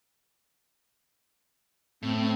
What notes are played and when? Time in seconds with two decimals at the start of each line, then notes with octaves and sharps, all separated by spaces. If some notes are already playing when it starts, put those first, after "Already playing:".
2.03 A2 C4
2.21 C4